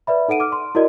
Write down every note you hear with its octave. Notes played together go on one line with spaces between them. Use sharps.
B4 D5 E5 B5
D#4 A4 F#5 D7 D#7
D6 F6
C6
E4 F#4 A#4 D5 D#5